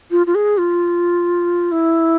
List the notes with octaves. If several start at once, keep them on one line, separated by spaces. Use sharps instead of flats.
F4
F4
G#4
F4
E4